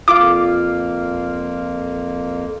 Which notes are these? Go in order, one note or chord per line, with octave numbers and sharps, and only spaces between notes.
F2 A#3 F4 F5 D6